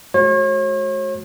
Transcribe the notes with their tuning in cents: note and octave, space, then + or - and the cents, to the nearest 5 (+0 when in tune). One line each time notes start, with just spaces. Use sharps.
G#3 +40 F#4 +0 C#5 -40